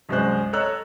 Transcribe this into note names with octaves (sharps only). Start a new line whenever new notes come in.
C2 F#2 G#3 F#4 C5 F#6
A4 C#5 D#5 A#5 E6 F#6